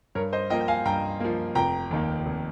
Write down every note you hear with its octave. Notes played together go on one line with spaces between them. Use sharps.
G2 A#4 C#5
C5 D#5
F3 A#3 D#5 G5
G5
F5 G#5
G2 G5 A#5
F3 A#3
F1 G5 A#5
D#2 D#3 A#3
F1